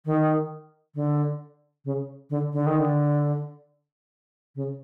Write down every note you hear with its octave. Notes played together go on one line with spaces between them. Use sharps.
D#3
D3
C#3
D3
D3
D#3
D3
C#3